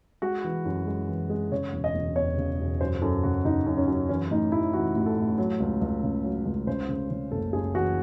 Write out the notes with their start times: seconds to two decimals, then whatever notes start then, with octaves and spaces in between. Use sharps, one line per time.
0.22 G#3 F#4
0.44 E3
0.65 F#2
0.87 G#3
1.09 E3
1.30 G#3
1.51 C#3 C#5
1.73 E1
1.84 D#5
1.95 E1
2.16 E2 C#5
2.38 C#3
2.59 E1
2.81 F#2 C5
3.02 F#2 A4
3.23 C#3 F#4
3.45 C#3 D#4
3.67 F#2
3.77 C#4
3.88 F#2
4.09 E3 C#4
4.31 A2 D#4
4.52 A1 E4
4.73 E3 F#4
4.95 A1
5.06 A4
5.17 A2
5.38 F#3
5.60 C#2
5.81 C#2
6.03 C#3
6.24 F#3
6.45 C#2
6.67 C#3 C5
6.89 C#3
7.11 C#3
7.31 F#1 A4
7.53 F#2 G#4
7.74 E3 F#4